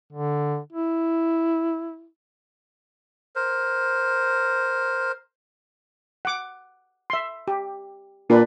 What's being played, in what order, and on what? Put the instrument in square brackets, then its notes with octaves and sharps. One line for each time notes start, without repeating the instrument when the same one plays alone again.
[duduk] D3
E4
[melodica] A#4 C5
[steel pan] F#5 D6
E5 C6
G4
[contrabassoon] A#2 [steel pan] D4 B4